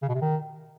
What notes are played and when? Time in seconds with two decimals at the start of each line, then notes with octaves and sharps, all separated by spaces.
0.02 C#3
0.09 B2
0.15 C3
0.21 D#3